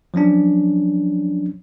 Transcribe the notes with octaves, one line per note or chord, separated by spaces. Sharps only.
F3 F#3 C#4 D4